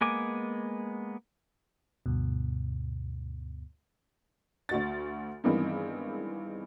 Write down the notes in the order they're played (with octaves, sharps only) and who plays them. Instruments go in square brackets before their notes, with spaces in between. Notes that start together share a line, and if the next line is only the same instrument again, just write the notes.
[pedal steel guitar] G#3 A#3 B3 G#5 D6
[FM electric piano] D2 G2 B2
[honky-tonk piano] D2 F#4 A6
G2 D#3 E3 G#3 B3 C4